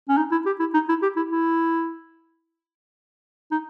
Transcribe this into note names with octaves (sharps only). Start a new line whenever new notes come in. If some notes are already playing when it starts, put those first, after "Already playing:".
C#4
D#4
E4
G4
E4
D#4
E4
G4
E4
E4
D#4